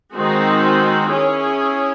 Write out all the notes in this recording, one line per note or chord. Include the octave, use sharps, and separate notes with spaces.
D#3 G#3 C4 D#4 F#4
C#4 E4 G#4 C#5